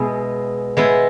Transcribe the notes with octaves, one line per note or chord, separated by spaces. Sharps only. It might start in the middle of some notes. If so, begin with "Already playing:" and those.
Already playing: B2 G#3 B3 E4 G#4
G#3 B3 E4